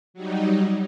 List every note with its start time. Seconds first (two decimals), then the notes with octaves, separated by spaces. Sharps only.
0.14 F#3 G3 D#4